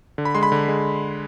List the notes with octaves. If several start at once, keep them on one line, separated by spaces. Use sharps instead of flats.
D3
B5
G#3 C6
B5
D3
G#3